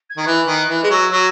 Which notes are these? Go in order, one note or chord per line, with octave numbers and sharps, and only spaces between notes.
G#6
D#3
E3 F#6
D#3
E3
G#3
F#3 E6
F#3